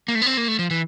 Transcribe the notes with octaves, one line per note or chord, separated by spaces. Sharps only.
A#3
A3
B3
C4
A#3
A3
F3
E3